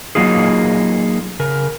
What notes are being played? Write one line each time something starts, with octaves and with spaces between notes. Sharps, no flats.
F#3 A#3 D#4 F4 G#4
C#3 A#4